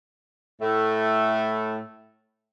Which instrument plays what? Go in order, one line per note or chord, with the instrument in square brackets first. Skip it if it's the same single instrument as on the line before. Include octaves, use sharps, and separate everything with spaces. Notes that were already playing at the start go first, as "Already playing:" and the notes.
[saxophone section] A2 A3